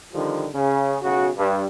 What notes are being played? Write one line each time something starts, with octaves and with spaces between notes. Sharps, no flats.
D3 D#3 F3 G3
C#3
B1 C#3 F#4
G2